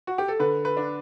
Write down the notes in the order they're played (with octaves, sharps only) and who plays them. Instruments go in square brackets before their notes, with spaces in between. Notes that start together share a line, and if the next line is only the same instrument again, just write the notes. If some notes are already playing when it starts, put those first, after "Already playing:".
[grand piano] F#4
G4
A4
D3 B4
B4
D4